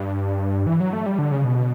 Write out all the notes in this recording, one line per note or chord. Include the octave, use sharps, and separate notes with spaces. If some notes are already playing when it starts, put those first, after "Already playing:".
Already playing: G2
E3
F#3
A3
G3
D3
C#3
B2